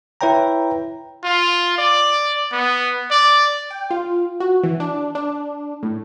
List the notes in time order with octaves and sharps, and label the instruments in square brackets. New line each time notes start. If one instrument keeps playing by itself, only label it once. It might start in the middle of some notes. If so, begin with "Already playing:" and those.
[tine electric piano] E4 B4 C#5 G5 A#5
[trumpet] F4
D5
B3
D5
[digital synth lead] G5
F4
F#4
E3
D4
D4
A2